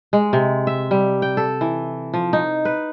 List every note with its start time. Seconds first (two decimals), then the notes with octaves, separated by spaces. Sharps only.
0.13 G#3
0.33 C3
0.67 E5
0.91 G3
1.22 G5
1.37 A4
1.61 E3
2.14 F3
2.33 D#4
2.65 B4